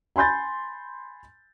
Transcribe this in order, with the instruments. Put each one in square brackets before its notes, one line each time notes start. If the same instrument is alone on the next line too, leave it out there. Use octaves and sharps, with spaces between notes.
[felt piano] G#5 B5 C6 G6 A6